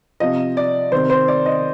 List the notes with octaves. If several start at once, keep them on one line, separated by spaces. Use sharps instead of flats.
C3 F3 D#5
D5
C3 D#3 C5
C5
D5
D#5